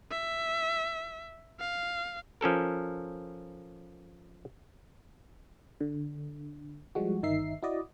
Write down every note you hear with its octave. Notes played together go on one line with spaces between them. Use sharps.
E5
F5
F3 C#4 A4 A#4
D3
F3 G3 G#3 F#4
G1 D#3 D#4 E5 C7
E4 F#4 D5 D#5